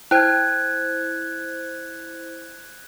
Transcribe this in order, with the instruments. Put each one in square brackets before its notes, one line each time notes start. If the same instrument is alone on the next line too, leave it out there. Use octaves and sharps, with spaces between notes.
[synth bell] E4 C5 [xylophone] G5 [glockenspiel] F#6 G#6